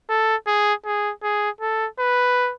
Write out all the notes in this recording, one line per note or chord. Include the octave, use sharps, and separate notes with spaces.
A4
G#4
G#4
G#4
A4
B4